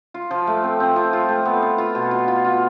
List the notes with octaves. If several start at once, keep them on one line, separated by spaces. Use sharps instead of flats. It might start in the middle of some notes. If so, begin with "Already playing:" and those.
F4
F3
A3
C4
C4
F3
F4
A3
B3
F4
F4
B2
F4
F4
F4